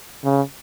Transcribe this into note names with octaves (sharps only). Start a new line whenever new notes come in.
C#3